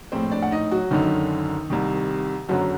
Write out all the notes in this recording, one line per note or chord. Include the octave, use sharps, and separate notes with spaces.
A#1 A2 C4 C5
D4 D5
F#5
D#4 D#5
F#3 F#4
F#1 F#2 D3 D#3 D#4
C2 C3 D#3
F#1 F#2 D3 F#3 F#4